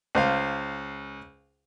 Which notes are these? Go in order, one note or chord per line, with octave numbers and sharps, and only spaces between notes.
C#2 C5 F5